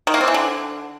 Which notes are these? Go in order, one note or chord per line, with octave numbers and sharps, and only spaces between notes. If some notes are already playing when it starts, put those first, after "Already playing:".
D#3
A#3
C4
E3
D3